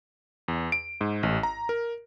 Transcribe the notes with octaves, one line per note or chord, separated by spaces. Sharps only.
E2
D7
G#2
A1
A#5
A#4